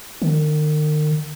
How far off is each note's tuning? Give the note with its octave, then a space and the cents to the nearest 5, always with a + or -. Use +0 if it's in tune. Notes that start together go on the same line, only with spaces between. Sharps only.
D#3 -40